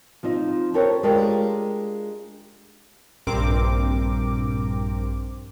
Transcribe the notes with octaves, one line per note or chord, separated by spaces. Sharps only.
F3 C4 D#4
G4 A4 A#4 C5 C#5
G#3 D4 F4 G4 A4 A#4
A#1 G2 C4 A#4 D6